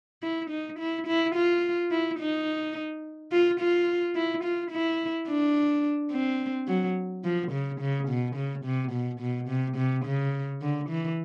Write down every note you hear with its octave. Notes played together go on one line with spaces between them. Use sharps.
E4
D#4
E4
E4
F4
E4
D#4
F4
F4
E4
F4
E4
D4
C4
F#3
F3
C#3
C#3
B2
C#3
C3
B2
B2
C3
C3
C#3
D3
E3